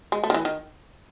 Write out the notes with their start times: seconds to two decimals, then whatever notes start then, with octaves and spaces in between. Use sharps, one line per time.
0.12 G#3
0.24 A3
0.30 D#3
0.34 E3
0.45 D#3